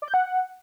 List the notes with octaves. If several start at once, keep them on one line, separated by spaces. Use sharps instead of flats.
D5
G6
F#5